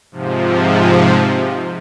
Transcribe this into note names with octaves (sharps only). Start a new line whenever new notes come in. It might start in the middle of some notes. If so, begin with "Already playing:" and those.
G#2 C3 F3